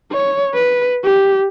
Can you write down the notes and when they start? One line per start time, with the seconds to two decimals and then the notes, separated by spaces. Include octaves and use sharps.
0.12 C#5
0.54 B4
1.04 G4